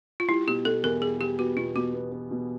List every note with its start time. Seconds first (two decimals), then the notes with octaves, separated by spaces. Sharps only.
0.20 F4
0.29 G3 E4
0.47 B2 G4
0.65 B2 A4
0.83 E2 A#4
1.01 G3 G#4
1.21 G3 G4
1.39 B3 F#4
1.57 B2 F4
1.75 B2 F#4
1.94 B3
2.12 B3
2.31 B2